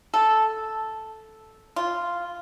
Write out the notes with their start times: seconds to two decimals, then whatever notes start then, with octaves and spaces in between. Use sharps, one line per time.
0.14 A4
1.76 F4